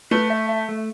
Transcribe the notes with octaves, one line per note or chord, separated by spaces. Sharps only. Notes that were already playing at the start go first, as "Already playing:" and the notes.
A3 B4
E5
E5
A3